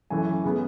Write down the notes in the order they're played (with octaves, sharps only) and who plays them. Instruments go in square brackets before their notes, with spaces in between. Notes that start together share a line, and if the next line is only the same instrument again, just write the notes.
[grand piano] F#2 E3 A3 G#5
C#3 G#3 B3